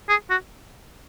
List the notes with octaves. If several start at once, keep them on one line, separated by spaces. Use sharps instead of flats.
G#4
F#4